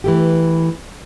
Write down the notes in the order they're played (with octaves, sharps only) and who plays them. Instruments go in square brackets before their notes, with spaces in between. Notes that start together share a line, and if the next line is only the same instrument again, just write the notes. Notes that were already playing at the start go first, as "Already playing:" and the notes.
[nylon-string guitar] E3 A3 G4